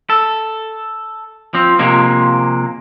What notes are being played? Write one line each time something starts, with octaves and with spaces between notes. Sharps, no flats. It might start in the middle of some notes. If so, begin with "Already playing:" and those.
A4
F3 C4
C3 F3 G#3 A#3